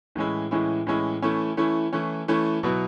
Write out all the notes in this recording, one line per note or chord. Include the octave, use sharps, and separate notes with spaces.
A2 E3 G#3 C#4 E4
A2 E3 G#3 C#4 E4
A2 E3 G#3 C#4 E4
E3 A3 C#4 E4
E3 A3 C#4 E4
E3 A3 C#4 E4
E3 A3 C#4 E4
B2 F#3 B3 E4